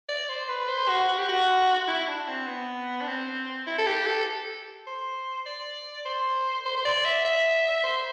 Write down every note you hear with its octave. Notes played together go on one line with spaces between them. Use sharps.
D5
C5
B4
C5
F#4
F#4
G4
F#4
E4
D4
C4
B3
D4
C4
E4
A4
G4
A4
C5
D5
C5
C5
C5
D5
E5
E5
C5